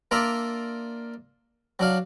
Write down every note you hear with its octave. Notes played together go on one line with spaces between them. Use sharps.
A#3 D4 F4 D5 E5 A#5
F#3 D4 F5